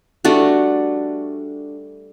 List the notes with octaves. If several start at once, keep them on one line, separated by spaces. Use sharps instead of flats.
G3 A3 D4 F#4